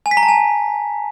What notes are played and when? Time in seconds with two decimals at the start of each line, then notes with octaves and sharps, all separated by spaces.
0.06 G#5
0.11 B6
0.17 A#5
0.23 A5
0.28 G#5